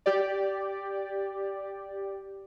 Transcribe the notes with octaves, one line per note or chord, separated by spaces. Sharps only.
G4 D5